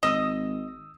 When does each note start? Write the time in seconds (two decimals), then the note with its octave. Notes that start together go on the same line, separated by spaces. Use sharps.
0.03 G#1 D#5 D#6 E6 E7